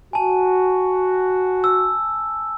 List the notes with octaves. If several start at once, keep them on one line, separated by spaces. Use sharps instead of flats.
F#4 G#5 A5
E6